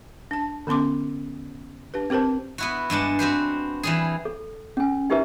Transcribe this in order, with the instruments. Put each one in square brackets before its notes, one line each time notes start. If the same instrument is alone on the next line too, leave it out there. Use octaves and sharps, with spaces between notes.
[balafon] D4 A5
D3 B3 C#4 C6 D6
D4 G4 B4
C4 G4 A#4 C5 A5
[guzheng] B3 E4 F#4
G2 G#3 D4 F#5
C4 F#4 B4 C5
E3 G3 G#4
[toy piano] A4
C#4 G#5
D#4 E4 G4 A#4 B4 E5